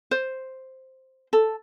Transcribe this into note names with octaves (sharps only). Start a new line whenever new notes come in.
C5
A4